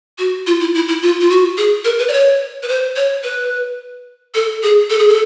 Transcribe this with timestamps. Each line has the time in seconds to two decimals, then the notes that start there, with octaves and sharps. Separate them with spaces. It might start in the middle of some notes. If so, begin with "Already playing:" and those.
0.19 F#4
0.47 F4
0.60 E4
0.75 E4
0.88 E4
1.02 F4
1.20 F4
1.30 F#4
1.57 G#4
1.85 A#4
1.99 B4
2.08 D5
2.13 C#5
2.63 B4
2.69 C5
2.96 C#5
3.23 B4
4.35 A4
4.63 G#4
4.90 A4
4.99 G#4
5.07 A4